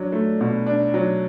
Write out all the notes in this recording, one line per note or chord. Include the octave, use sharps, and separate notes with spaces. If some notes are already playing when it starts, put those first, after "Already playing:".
Already playing: F#3 D4
A3
B2
D4
F#3